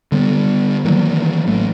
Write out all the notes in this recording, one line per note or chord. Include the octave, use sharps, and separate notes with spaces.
D3 G3 B3
D#3 E3 F#3 A#3
A1 A3